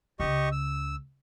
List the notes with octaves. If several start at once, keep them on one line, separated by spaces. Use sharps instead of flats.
C#2 C#3 G4 D#5 C#6
E6